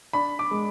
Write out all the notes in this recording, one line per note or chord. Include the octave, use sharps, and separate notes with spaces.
D4 B5
D6
G#3